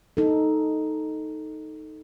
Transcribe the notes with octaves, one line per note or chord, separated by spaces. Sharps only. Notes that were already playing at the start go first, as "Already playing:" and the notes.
D#4 A4